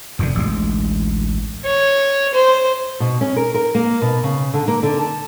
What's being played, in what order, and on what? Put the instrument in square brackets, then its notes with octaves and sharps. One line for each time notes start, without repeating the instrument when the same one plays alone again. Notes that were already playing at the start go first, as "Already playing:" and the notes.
[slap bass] F1 E2 A#2 D3
A1 D2 G#3
[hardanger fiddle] C#5
C5
[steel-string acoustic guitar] B2
C#4
A#4
A#4
A#3
B2
C#3
D3
A#3
D3
A5